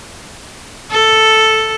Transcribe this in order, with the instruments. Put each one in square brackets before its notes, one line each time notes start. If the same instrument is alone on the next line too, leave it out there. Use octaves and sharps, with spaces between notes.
[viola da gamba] A4